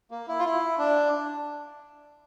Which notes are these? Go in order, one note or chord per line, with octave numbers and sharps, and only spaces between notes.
A#3
E4
F4
E4
D4